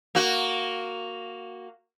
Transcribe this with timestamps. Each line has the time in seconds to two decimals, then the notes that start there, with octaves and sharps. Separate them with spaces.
0.15 A#3 F#4